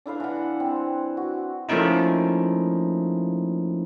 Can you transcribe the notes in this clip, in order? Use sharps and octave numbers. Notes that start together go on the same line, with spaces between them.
D4 E4 B4 F5
E3 F#5
C4
F#4
F3 A3 A#3 C#4 D#4 E4